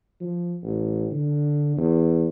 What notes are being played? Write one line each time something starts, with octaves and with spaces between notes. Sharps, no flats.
F3
A1
D3
E2